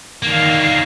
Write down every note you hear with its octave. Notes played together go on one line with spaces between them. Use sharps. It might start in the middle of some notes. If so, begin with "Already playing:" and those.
D3 D#3 A#3 F5